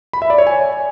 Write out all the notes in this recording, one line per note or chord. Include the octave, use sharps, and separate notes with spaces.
B5
E5
D5
C#5
G#5